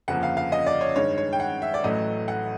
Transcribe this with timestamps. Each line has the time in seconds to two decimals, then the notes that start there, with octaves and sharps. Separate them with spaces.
0.08 G1 F2 C#3 F3 A#3 F#5
0.23 F5
0.37 F5
0.52 D#5
0.66 D5
0.81 C#5
0.96 G2 D#3 G#3 C#5
1.18 C#5
1.33 G5
1.40 F#5
1.62 E5
1.74 D5
1.84 A1 A2 F#3 A3 D#5
2.28 F#5